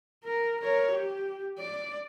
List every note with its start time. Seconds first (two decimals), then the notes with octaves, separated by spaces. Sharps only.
0.24 A#4
0.61 A#4 C#5
0.91 G4
1.58 D5